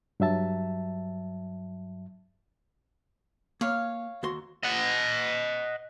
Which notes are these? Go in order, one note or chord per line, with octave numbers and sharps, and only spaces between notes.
G2 F#3 E5 A5
A#3 C#5 F5
D#2 F#4 C6
D#5 F#5